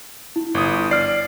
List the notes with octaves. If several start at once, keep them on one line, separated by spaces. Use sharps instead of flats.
E4
G1 D#6
D5 F6 C7